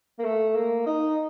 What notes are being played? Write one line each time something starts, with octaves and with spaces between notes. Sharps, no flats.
A#3
A3
A#3
D#4